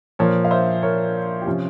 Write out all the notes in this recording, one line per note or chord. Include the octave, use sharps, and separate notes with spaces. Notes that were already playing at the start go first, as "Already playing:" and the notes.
A#2 F3 A#4 C#5
F5
C5 E5
A#4 C#5
G4
C3 F3 C#4 F4